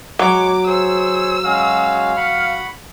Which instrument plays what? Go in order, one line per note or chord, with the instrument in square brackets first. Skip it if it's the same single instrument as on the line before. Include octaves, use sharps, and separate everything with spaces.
[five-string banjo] F#3 [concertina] G#3 C#5 C#6 [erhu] D6
[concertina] G#4 C5 C#5 [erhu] E6
[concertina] G#3 C#4 F#4 [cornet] F5
[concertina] F#5 B5 C#6